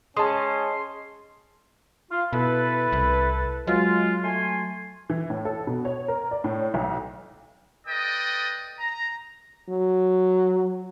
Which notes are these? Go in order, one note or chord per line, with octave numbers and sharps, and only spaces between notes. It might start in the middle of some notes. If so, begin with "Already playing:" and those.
G#3 C#4 A5 C6 D#6
F4 F5
B2 E4 A4 B4
C2
F#3 G#3 F4
A3 G#5 C6
E3
A2
A4
B2
C#5
A#4
D5
A2
B1
A4 B4 D5 D#5 G5 D#6
A#5
F#3